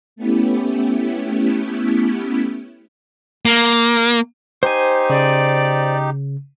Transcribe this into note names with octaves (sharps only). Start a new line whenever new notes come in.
A3 B3 C#4 E4 G4
A#3
D#4 G4 C5 G#5
C#3 D5